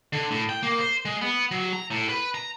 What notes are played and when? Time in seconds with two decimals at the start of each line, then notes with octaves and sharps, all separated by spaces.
0.13 D3
0.31 A2
0.49 G5
0.63 A#3
0.80 C5
1.05 G#3
1.21 B3
1.51 F#3
1.73 A#5
1.91 A2
2.09 B4
2.35 A#5